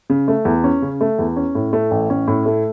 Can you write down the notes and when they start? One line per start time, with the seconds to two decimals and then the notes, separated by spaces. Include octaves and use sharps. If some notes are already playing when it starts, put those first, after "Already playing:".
0.10 C#3
0.28 A3
0.45 E2
0.64 C#4
0.82 C#3
1.01 A3
1.19 E2
1.37 C#4
1.55 A2
1.73 A3
1.91 A1
2.10 C#4
2.27 A2
2.46 A3